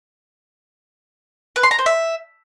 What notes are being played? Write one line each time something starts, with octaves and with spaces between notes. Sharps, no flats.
B4
C6
A#5
C5
E5